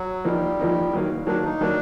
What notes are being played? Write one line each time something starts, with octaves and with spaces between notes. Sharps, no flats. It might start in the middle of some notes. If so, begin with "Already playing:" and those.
Already playing: F#3
F3 G3 A#3 D#4
F3 A#3 D#4
D#3 F#3 A#3
D#3 F#3 A#3 D4
D#4
D#3 F#3 A#3 D4